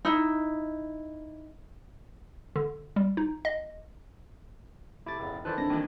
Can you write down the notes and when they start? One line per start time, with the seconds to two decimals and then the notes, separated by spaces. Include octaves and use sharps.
0.05 D#4 E4
2.56 D3
2.96 G3
3.17 D#4
3.45 D#5
5.06 C3 A3 E4 D6 A6
5.19 F1 E2 C#3
5.45 D#3 E3 E4 A4 B4 C5 D5 A5
5.58 C4 D4 A#6
5.70 D#2 D#3 E3